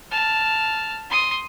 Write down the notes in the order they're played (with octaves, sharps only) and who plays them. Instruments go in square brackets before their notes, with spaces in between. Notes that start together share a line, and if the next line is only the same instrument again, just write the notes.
[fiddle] A5 F6
C6 D#6